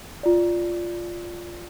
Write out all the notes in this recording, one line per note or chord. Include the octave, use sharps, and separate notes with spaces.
F4 D5